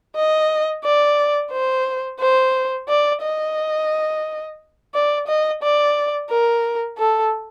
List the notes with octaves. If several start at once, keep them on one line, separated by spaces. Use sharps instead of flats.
D#5
D5
C5
C5
D5
D#5
D5
D#5
D5
A#4
A4